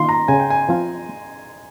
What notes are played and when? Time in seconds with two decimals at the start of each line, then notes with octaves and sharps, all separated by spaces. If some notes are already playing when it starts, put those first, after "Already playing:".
Already playing: D#3 A#3 F4 C6
0.09 A#5
0.28 C#3 G#5
0.39 G5
0.50 G#5
0.69 F3 C4 F4